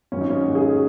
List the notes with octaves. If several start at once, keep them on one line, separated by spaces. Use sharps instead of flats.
G#2 D#3 F#3 C#4
D#4
C#4
F#4
G#4